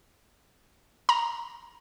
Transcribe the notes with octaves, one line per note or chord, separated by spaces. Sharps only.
A#5